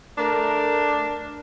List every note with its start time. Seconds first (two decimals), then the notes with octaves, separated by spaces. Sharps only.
0.18 A3 D4 A#4